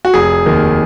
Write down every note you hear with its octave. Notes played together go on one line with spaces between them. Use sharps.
F#4
F1 G#4
D#2 D#3